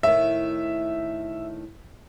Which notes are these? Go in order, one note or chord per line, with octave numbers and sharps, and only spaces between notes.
A2 D#3 E5